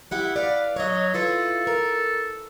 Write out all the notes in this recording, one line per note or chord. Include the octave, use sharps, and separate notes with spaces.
B3 E4 G4 F#5
B4 D5 F5
F#3 C#5 D#5
E4 F4 A4 B4
A#4